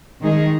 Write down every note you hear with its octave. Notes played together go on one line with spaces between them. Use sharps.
D#3 G#3 D#4 G#4